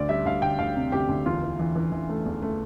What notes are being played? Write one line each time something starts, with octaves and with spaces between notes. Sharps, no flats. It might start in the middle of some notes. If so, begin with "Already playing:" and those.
Already playing: D2 D5
G3 E5
D2 F5
D2 G5
D2 F5
C3
D2 G4
D2
E2 F4
E3
E3
E3
E3
A3
E2
A3